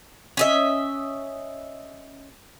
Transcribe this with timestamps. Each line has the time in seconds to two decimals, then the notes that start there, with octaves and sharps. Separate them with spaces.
0.37 C#4 D#5 E5